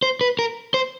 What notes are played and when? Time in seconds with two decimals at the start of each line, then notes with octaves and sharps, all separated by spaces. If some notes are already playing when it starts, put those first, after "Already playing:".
0.03 C5
0.21 B4
0.39 A#4
0.74 C5